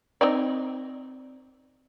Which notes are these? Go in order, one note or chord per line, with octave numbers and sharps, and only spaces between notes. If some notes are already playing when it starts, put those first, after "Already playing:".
C4 D#4 D5